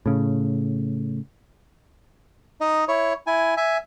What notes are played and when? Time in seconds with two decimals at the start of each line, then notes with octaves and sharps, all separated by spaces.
0.06 A2 C#3
2.61 D#4 D#5
2.88 E4 C#5
3.27 E4 G#5
3.57 E5 G#5